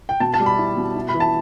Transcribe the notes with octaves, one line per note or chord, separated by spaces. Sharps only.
G5
B2 A5
A5
G3
B5
E4
B2
E4
B5
E3
A5